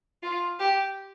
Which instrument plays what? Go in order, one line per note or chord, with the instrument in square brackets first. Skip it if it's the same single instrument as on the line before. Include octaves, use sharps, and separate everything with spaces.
[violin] F4
G4